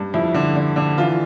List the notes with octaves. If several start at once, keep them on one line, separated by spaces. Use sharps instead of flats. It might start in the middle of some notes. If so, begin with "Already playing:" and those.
Already playing: G2
F2 E4
D3
D3
D3
E3 F4